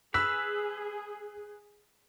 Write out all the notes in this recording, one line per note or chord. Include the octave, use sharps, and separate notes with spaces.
G#4 B4 E6 B6